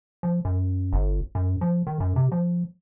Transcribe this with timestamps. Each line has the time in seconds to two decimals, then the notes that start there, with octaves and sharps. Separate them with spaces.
0.23 F3
0.45 F#2
0.93 G1
1.35 F#2
1.61 F3
1.87 D#3
2.00 F#2
2.16 C3
2.32 F3